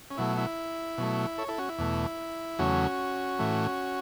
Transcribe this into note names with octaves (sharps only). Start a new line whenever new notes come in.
C#4
B2 F#3 A3 E4
E4
B2 F#3 A3
A4 C#5
E4 A4
C#4 F#4
E4
E2 B2 A3
E2 C#3 F#3 A3 C#4 F#4
A2 E3 A3